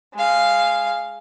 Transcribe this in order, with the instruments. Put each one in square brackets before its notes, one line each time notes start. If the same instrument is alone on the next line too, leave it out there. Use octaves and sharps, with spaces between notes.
[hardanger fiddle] G#3 F5